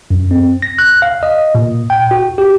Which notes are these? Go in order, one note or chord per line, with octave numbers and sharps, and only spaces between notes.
F#2
C4
A#6
F#6
F5
D#5
A#2
G5
F#4
G4